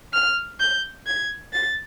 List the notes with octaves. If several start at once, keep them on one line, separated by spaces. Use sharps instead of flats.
F6
G6
G#6
A6